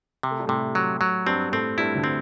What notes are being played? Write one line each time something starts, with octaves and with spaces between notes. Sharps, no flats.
C3
A3
G3
A2 C3 A3
F#3
F#3
G2 G3 C4
A2 A3 C4
G2 G3 E4
D2 D3
C4